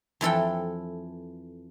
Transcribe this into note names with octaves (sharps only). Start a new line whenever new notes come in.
F2 E3 A4 G5